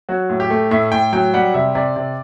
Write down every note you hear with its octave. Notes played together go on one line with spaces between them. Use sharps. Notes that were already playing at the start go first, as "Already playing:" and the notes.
F#3 F#4
A2
G4
A3
A2 E5
A2 G5
F#3 G5
G3 F#5
C3 E5
C3 D5
C3